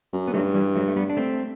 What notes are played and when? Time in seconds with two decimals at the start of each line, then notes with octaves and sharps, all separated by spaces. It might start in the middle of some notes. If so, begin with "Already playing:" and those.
0.13 F#2
0.28 B3
0.34 G2 F#3 A3
0.55 E3 G3
0.75 F#3 A3
0.88 A3
0.96 G3 B3
1.10 D4
1.17 A3 C4